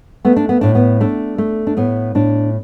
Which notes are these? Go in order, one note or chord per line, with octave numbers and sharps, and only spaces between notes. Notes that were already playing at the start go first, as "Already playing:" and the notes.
A3 B3
D4
B3
A2 D4
B3
A3 D4
A3
D4
A2 B3
A2 D4